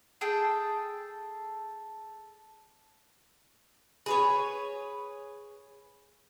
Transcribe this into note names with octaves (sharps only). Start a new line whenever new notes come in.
G#4 A4 G5 A5
G#4 B4 C#5